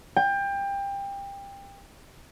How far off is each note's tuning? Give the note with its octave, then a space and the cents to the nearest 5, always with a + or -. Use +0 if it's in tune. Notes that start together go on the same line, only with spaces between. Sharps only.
G5 +25